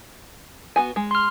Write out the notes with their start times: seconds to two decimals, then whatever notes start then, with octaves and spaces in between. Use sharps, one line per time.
0.76 B3 F#4 G#5
0.96 G#3
1.11 C6 F6